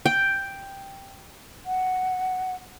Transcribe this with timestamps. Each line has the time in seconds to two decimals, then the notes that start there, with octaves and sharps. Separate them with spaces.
0.06 G5
1.66 F#5